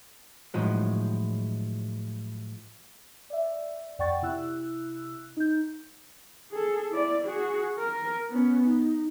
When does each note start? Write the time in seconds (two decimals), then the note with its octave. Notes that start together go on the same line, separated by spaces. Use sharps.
0.54 A2 D#3 F3 F#3 G#3
3.30 D5 E5
3.99 F2 D5 F#5 G5 C#6 A6
4.22 C3 E4 E6 F#6
5.37 D#4 G6
6.51 G#4 A4
6.91 E4 D5
7.26 F#4 G#4
7.79 A#4
8.29 B3 C#4
8.66 D#4